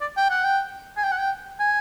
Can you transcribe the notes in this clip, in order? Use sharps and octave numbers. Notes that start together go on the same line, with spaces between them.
D5
G5
F#5
G5
G#5
G5
F#5
G5
G#5